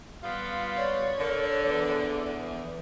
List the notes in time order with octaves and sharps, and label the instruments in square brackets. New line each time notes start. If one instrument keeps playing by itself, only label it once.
[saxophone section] G3 B3 F4
[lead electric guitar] C#5 [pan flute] D5
[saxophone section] D3 [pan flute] A#4
[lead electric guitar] E2 [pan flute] B4